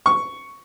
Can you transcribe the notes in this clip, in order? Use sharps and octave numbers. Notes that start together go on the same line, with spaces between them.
C#6